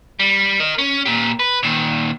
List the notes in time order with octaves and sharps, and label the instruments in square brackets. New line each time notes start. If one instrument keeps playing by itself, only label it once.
[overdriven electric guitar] G3
A#4 D#5
C#4
A#2 G4
B4
A#2 D#3